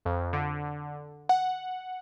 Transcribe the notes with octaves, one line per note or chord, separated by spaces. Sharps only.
F2
D3
F#5